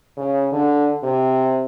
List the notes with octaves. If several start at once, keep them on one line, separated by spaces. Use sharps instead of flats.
C#3
D3
C3